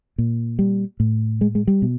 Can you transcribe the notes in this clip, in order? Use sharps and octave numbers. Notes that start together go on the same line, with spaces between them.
A#2
G3
A2
G#3
G#3
G3
B2